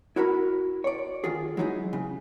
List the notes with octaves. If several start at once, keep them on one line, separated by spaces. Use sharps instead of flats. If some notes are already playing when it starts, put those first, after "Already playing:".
E4 F#4 A#4 B5
C#5 D5
D#3 F4 G#4
F#3 G#3 D#4 E4 G#4
C#3